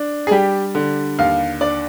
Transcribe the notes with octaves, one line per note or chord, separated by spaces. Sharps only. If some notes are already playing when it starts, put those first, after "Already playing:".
Already playing: D4
G#4
G3 G4
D3
D#2 F5
D4 D5